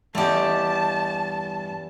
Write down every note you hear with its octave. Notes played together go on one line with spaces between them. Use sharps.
E2 G2 A3 E4 G4 D#5 G5 A5